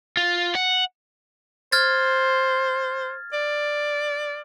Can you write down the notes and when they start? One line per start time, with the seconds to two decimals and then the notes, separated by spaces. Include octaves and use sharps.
0.17 F4
0.55 F#5
1.72 C5 F6 G#6 A6
3.33 D5